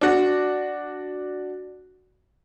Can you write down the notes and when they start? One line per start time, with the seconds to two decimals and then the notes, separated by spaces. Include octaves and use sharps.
0.01 D4 F#4